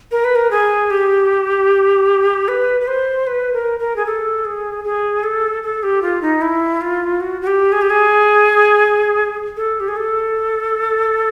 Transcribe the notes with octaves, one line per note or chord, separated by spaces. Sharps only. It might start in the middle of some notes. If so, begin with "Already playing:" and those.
A#4
B4
A#4
G#4
G4
B4
B4
C5
B4
A#4
A#4
G#4
A4
G#4
G#4
A4
A4
G4
F4
D#4
E4
F4
F#4
F#4
G4
G#4
G4
G#4
A4
G4
G#4
A4